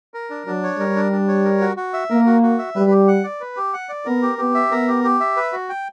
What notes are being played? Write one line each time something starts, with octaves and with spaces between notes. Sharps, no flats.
A#4
D4
F#3 D4
C#5
G3 A#4
D4
D4
C#5
A#4
F#4
F#4
E5
A#3 A#4
F#4
F#4
E5
G3 B4
G4
F#5
D5
B4
G4
F#5
D5
B3 A#4
G4
B3 G4
E5
B3 A#4
G4
G4
E5
B4
F#4
G5